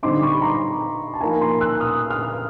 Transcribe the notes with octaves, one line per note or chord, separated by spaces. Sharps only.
D3 G3 C4 D#4 C6 D6
B5 C#6
A#5 C6
A5
F3 A#3 D#4 G#5 A#5
A#5 C6
E6 F#6
D#6 F6
D#6 F6